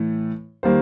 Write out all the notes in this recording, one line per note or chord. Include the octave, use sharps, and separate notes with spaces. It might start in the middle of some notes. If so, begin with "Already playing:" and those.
Already playing: A2 E3 A3
D#3 G3 A#3 C5